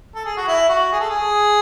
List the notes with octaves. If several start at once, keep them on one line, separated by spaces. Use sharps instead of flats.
A4
G#4
F#4
E4
F#4
G#4
A4
G#4